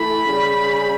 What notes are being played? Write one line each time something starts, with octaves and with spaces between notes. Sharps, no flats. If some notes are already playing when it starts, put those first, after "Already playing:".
Already playing: E3 A3 B5
C#3 G3